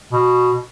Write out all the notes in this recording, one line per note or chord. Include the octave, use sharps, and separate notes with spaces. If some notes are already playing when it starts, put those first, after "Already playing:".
B2